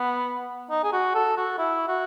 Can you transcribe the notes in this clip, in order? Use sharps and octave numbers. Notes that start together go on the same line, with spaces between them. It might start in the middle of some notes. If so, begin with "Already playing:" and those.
Already playing: B3
D#4
G#4
F#4
A4
F#4
E4
F#4